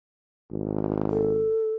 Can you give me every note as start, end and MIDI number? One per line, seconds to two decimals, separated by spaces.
0.51 1.50 32
1.10 1.75 69